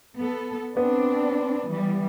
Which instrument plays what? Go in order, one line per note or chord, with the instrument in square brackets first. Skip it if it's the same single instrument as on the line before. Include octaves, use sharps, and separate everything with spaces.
[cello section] B3 A4
[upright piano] B3 [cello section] C4 D4
[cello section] E3 G3